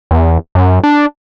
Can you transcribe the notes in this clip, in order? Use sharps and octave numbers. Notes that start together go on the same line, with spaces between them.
E2
F#2
D4